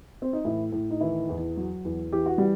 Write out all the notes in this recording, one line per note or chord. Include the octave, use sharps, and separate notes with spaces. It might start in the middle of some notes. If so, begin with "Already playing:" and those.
C4
D#4
A2 E3 E4
A2
D#4
D#3 E3 E4
E2
F#3
E2
E3 G4
F#4
E3 G3 G4